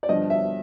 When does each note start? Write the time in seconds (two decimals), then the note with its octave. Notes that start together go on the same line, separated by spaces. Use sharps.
0.03 D5
0.08 G2 D3 F3 D#5
0.30 E5